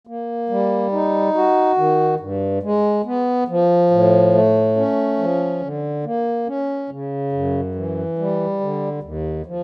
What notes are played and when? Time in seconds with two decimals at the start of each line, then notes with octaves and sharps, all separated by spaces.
0.07 A#3
0.49 G3
0.92 D#4
1.35 F#4
1.77 D#3
2.20 G2
2.63 G#3
3.05 B3
3.48 F3
3.91 A2
4.33 A3
4.76 C#4
5.19 F3
5.62 D3
6.05 A#3
6.47 C#4
6.90 C#3
7.32 F#2
7.75 E3
8.18 G3
8.61 D3
9.03 D#2
9.46 F3